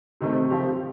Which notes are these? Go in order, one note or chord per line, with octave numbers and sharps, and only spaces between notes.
C3 D#3 A3 C4
F3 C4 G4